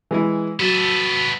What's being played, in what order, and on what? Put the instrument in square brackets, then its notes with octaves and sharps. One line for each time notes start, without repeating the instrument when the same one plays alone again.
[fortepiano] E3 G#3 E4
[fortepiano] F#3 [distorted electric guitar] B3 A4